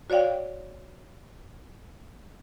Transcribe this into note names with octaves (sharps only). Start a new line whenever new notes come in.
F#4 C#5 D5 F5 G5